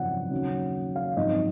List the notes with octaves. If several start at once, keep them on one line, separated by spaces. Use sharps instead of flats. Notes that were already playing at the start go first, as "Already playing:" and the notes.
Already playing: G#1 F#2 C#3 F3 C4 F#5
D#2 C#3 F#3 C#4
F5
G#1 F#2 F3 C4 D#4 D#5